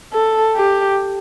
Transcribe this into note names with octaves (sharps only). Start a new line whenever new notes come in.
A4
G4